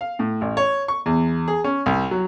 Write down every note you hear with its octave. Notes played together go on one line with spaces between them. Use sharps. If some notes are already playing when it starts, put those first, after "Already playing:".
F5
A2
A1
C#5
C#6
E2
G#4
C#4
C2
F#3